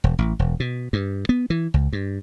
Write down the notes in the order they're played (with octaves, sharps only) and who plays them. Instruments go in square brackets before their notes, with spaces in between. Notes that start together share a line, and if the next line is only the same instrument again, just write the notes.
[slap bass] E1
A1
E1
B2
G2
B3
E3
C#2
G2